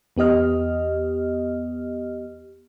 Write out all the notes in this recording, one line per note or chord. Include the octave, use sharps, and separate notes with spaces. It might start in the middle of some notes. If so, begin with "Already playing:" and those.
E2 B3 G4 D#5 F6